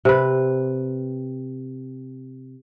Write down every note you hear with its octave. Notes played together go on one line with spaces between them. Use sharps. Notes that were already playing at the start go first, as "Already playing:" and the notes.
C3 B4